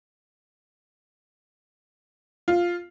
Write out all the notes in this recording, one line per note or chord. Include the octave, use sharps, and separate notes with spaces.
F4